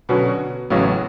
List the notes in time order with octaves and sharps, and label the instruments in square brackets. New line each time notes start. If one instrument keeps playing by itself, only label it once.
[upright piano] B2 [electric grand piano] D3 F#3 C#4 F#4 B4
[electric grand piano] A1 A2 F#3 B3 F#4 [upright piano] C#3